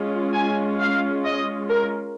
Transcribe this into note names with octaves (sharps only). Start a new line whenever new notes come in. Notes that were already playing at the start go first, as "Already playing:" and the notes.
Already playing: G#3 C#4 F4
G#5
F5
D#5
A#4